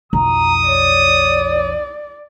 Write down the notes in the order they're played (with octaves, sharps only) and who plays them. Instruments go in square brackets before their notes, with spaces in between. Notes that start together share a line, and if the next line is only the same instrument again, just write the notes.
[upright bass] B1 F2 [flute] A#5 [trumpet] D#6
[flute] C#5 [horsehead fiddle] D5